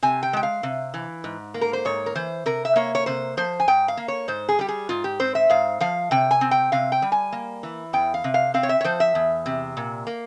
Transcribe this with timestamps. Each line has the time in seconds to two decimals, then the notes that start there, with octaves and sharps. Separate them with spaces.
0.03 C3 G#5
0.23 G5
0.33 G#3 G5
0.43 F5
0.63 C3
0.94 E3
1.24 G#2
1.54 A#3
1.61 A#4
1.73 C5
1.85 G#2 C#5
2.06 A#4
2.15 E3 C5
2.46 C3 A#4
2.65 E5
2.76 A#3 C#5
2.95 C#5
3.06 C3 C5
3.37 F3 C5
3.60 G#5
3.68 G#2 G5
3.88 F5
3.97 A#3
4.08 C#5
4.28 G#2 C5
4.49 G#4
4.59 G3 G4
4.68 G#4
4.89 G#2 F4
5.04 G4
5.19 C4 C5
5.35 E5
5.50 G#2 F5
5.80 F3 F5
6.11 C3 G5
6.31 G#5
6.41 C4
6.51 G5
6.72 C3 F5
6.92 G5
7.02 G3
7.12 G#5
7.32 A#3
7.63 E3
7.93 E2 G5
8.14 F5
8.24 C3
8.34 F5
8.54 C4 F5
8.63 C#5
8.69 E5
8.81 C#5
8.84 F3 C5
9.00 E5
9.15 E2
9.46 C3
9.77 A#2
10.07 A#3